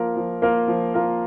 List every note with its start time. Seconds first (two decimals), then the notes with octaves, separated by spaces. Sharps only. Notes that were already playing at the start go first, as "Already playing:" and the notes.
Already playing: F3 A#3 F4 A#4
0.17 F3
0.42 A#3 F4 A#4
0.68 F3
0.94 A#3 F4 A#4